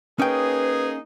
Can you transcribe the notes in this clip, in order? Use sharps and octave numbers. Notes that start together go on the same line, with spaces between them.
A#3 C#4 D#4 G#4 B4 G5